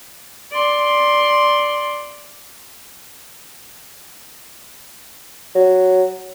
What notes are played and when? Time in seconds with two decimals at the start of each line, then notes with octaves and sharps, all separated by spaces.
0.52 D5 C6
5.55 F#3